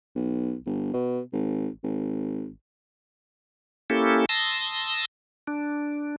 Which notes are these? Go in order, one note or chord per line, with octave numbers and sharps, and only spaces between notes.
B1
G1
B2
G#1
G#1
A#3 C#4 E4 G4 A4
A5 C6 D#6 E6 A#6
D4